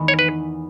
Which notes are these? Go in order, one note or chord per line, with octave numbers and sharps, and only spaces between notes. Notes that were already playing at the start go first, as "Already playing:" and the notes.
Already playing: E2 D#3 G#3 B3 E4
C#5
B4